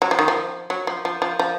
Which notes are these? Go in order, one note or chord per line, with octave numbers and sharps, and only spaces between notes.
F#3
F3
D#3
F3
F#3
F3
F3
F3
F3